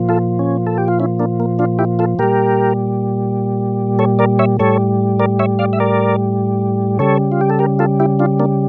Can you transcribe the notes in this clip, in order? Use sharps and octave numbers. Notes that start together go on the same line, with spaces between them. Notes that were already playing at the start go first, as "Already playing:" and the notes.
Already playing: A#2 F3
F4 A4
C#4
A4
G4
F4
C#4 E4
A#3 D4
A#3
D4 F4
E4 G4
F4 A4
A#2 G3 G4 A#4
A4 C#5
A#4 D5
C#5 E5
A2 G3 A4 C#5
A#4 D5
C#5 E5
D5 F5
E5
A#4 D5
C#3 G3 A4 C#5
F4
G4
A4
G4 A#4
F4 A4
E4 G4
D4 F4
A#3 D4